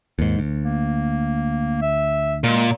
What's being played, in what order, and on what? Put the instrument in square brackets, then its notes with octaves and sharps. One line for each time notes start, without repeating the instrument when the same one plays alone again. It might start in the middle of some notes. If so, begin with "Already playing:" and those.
[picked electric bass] D#2 G#2
D2
[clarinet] A#3
E5
[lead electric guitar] A#2 [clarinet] G#3